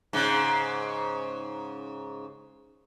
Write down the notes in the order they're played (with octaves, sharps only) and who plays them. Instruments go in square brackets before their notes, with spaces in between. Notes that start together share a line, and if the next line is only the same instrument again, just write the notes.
[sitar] G#2 C#3